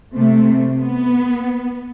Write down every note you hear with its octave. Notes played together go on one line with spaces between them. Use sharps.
C3 A3
B3